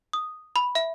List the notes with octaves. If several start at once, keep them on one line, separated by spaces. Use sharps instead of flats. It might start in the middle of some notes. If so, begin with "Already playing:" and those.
D#6
B5
E5